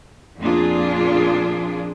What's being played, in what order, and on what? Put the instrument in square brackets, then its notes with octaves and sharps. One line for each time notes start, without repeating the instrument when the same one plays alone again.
[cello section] F2 A#2 C4 D4 F4 G#4